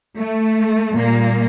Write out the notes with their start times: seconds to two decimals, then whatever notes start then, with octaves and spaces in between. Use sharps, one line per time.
0.18 A3
0.95 A#2 G3 A#3